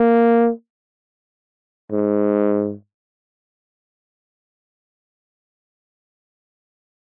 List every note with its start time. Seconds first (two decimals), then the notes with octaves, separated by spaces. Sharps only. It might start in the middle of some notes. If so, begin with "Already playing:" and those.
Already playing: A#3
1.92 G#2